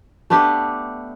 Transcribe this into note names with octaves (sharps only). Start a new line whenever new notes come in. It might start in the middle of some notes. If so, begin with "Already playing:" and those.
A3 B3 D4 G4